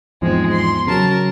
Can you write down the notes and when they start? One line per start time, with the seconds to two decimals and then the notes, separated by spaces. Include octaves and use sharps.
0.22 E2 G#2 F3 G#3 C4
0.52 C6
0.87 C#3 F#3 A#4 A5